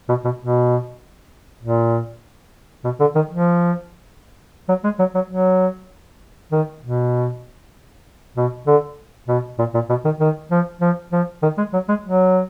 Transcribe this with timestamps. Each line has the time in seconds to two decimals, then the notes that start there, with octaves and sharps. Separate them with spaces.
0.09 B2
0.24 B2
0.39 B2
1.62 A#2
2.84 B2
3.00 D3
3.15 D#3
3.31 F3
4.69 F#3
4.84 G#3
4.99 F#3
5.15 F#3
5.30 F#3
6.52 D#3
6.83 B2
8.37 B2
8.67 D3
9.28 B2
9.59 A#2
9.74 A#2
9.89 B2
10.05 D#3
10.20 D#3
10.51 F3
10.81 F3
11.12 F3
11.42 D#3
11.58 G#3
11.73 F#3
11.88 G#3
12.04 F#3